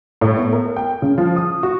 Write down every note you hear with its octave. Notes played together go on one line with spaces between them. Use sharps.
A2
B3
A#4
G5
C#3
F3
D#6
F#4